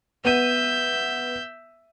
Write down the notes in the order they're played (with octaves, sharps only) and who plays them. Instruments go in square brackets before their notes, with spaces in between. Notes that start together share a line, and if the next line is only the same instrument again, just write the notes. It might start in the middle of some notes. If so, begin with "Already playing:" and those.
[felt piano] B3 D#7 [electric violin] E5 G6